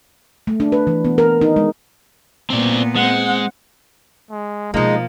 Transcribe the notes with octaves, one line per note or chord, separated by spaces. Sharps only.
A3
D4
B4
E3
B3
A#4
D#4
G#3
A#2 B3 C4 D5
G#3 C4 F#5
G#3
B2 F3 G#3 A#3 D#4